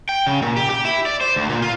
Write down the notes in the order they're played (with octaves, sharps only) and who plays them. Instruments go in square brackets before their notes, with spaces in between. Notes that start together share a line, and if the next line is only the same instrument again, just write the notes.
[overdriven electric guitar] G5
C#3
A#2
G4
G4
E4
D5
C5
D2
A#2
F4